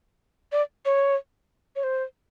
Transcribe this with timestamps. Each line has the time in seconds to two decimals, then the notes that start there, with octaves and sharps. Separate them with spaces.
0.52 D5
0.85 C#5
1.76 C#5
1.83 C5